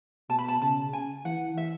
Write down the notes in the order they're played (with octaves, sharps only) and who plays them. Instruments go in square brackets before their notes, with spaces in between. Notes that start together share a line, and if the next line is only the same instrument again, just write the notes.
[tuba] B2 [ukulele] A5
[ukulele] B5
A5
[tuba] C#3 [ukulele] A5
[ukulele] G#5
[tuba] E3 [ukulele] F#5
[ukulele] E5